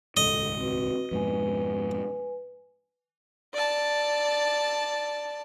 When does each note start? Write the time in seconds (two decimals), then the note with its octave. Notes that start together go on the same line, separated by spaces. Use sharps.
0.17 D#1 C#2 G#2 A4 D#5
0.57 C4 F#4 B4
1.11 F2 G#2 B2 B4 G#5
3.54 D5 A5